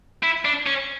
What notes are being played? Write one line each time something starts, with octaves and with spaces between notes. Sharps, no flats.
E4
D4
C#4